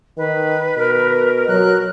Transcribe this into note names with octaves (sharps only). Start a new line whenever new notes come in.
D#3 B4
B2 A#4
F#3 A#4 F#6